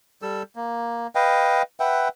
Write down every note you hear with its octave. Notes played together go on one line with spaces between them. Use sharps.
G3 A4 E6
A#3
B4 D#5 F5 G5
B4 E5 F#5 G5